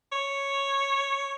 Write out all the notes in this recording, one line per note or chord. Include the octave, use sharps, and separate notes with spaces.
C#5